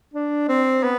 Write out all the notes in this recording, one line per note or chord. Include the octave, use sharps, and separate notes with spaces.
D4
C4
B3